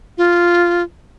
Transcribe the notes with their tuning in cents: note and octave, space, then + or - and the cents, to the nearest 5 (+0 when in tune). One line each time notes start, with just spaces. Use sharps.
F4 -5